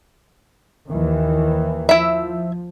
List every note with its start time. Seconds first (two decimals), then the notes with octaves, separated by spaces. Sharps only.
0.89 D#2 D#3 E3
1.89 F3 E4 E5